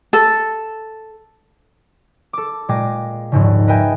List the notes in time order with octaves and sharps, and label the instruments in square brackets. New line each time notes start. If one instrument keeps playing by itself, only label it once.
[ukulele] A4
[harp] A4 D6
A#2 G#3 G5 D6 A#6
A#1 D#2 G#2 C#3
A#4 B4 D#5 E5 G5 G#5